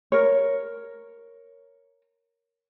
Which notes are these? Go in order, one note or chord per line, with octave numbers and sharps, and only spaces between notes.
A#4 C#5